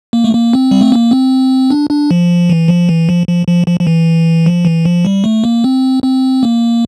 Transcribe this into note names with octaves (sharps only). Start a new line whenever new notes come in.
A#3
A3
A#3
C4
G3
A3
A#3
C4
D4
D4
F3
E3
F3
E3
F3
F3
F3
F3
F3
E3
F3
E3
F3
G3
A3
A#3
C4
C4
A#3